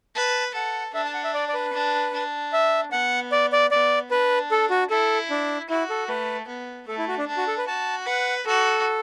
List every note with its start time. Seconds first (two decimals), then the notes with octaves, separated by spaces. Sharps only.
0.15 B4 A5
0.55 A4 F#5
0.94 D4 E5
1.05 A5
1.14 F#5
1.24 E5
1.34 D5
1.48 D5
1.54 B4
1.73 D4
2.14 D4
2.53 E5
2.92 B3 F#5
3.32 D5
3.52 D5
3.71 B3 D5
4.11 D4 B4
4.51 A4
4.70 F#4
4.90 E4 A4
5.30 D4
5.69 E4 F#4
5.90 A4
6.09 A3 B4
6.48 B3
6.88 A3 A4
6.98 E4
7.08 F#4
7.18 D4
7.28 D4
7.37 F#4
7.48 A4
7.58 B4
7.68 F#4 A5
8.06 B4 F#5
8.46 F#4 A4